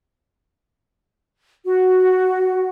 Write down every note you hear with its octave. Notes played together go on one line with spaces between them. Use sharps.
F#4